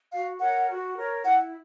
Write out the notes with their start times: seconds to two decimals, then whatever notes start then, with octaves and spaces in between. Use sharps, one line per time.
0.11 F#4 F5
0.40 A#4 C#5 F#5
0.68 F#4
0.96 A#4 C#5
1.25 E4 F#5